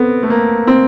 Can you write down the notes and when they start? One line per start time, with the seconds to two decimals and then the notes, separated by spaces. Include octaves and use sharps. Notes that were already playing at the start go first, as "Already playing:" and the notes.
Already playing: B3 C4 A4
0.23 A3
0.30 A#3
0.67 C4